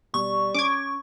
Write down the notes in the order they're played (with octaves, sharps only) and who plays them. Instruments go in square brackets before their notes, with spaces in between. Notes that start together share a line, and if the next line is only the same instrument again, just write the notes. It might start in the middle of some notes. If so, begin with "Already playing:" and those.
[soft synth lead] B2 [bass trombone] G3 [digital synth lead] C#6
[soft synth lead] C#4 [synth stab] D6 G#6